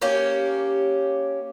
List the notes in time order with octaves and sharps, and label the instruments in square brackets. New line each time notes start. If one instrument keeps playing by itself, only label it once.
[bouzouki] A#3 C#4 G4